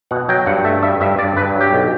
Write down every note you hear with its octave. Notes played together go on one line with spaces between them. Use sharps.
B2 F#5
F#3 G5
G2 F#5
A3 E5
G2 E5
G2 E5
G2 D5
G2 B4
F#3
G4
B1